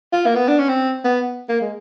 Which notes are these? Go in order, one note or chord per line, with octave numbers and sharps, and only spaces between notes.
F4
A#3
B3
D4
C#4
C4
B3
A#3
G#3